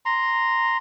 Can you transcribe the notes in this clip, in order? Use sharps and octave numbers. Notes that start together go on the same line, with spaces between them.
A#5 C6